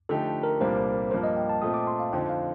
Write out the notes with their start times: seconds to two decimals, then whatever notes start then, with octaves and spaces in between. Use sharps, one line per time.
0.09 D3 F3 A3 D#4 G4 A4
0.43 A#4
0.61 C2 A#2 G3 A#3 D4 C5
1.11 G2 F3 A#3 C5
1.24 D#5
1.36 G5
1.49 A5
1.62 A#2 A3 C4 D#6
1.74 D6
1.87 C6
2.00 F5
2.13 F2 D3 F3 C4 D#4 G5
2.29 F5